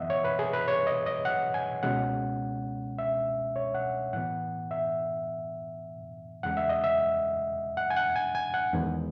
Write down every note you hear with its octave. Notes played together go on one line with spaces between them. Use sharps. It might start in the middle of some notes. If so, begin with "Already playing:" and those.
Already playing: F#2 E3 B3 D#5 E5 F#5
C#5
B4
G#4
B4
C#5
D#5
D#5
F#5
G#5
C#2 B2 G#3 C#4 F#5
E5
C#5
F#5
A2 E3 B3 F#5
E5
E2 C#3 G#3 F#5
E5
D#5
E5
F#5
G#5
F#5
G#5
G#5
F#5
E2 D#3 G#3 B3